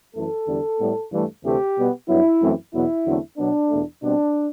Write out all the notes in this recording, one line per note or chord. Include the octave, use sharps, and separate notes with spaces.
F#2 E3 A3 A4
E2 D3 G3
A2 G3 B3
G2 E3 A3
D2 C3 E3 A3 C4 G4
B2 G3 B3
G2 F#3 B3 E4
F#2 E3 A3 C4
E2 B2 F#3 B3 E4
E2 D3 F#3 A3 C4
B2 F#3 B3 D4
E2 B2 A3
B2 G3 C4 D4